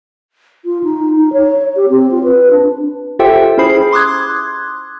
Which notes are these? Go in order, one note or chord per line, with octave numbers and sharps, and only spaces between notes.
F4
D#4
D#4
C#5
G4
C4
F4
B4
D4
F4 G4 A4 C5 E5 G5
C#4 E4 G#4 C5 B5 C7
C6 D6 D#6 F#6 G#6